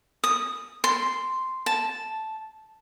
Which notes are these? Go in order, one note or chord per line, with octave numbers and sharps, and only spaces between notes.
D#6
C6
A5